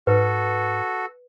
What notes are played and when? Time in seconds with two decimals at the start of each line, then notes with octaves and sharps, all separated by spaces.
0.07 G#2 F#4 A4 B4